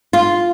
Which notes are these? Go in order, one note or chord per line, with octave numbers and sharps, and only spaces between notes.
F4